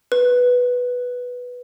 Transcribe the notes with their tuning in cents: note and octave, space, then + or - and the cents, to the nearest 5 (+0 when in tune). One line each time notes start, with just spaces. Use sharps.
B4 -5